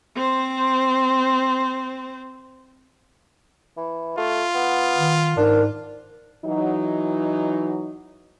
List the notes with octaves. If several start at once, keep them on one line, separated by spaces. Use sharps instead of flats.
C4 C5
E3
A3 F4
B3
D#3
G#2 D4 A#4
E3 F#3 D#4